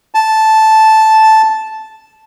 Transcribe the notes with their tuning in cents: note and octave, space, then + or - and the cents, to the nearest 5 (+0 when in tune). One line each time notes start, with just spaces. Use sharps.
A5 -5